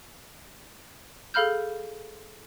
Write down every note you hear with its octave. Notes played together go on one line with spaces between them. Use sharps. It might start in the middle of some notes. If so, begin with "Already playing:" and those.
G#4 A4 F5 B5 F6 G6